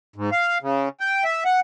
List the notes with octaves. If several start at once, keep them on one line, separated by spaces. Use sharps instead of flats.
G#2
F5
C#3
G5
E5
F#5